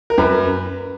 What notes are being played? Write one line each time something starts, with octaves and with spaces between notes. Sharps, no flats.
A#4
F#2 B4